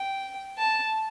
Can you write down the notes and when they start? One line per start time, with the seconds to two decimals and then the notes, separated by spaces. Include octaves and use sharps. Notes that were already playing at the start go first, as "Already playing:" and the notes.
Already playing: G5
0.57 A5